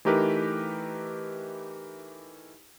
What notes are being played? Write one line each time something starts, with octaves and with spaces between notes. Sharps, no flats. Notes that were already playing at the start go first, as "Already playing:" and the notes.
E3 A3 D#4 G4 A#4 B4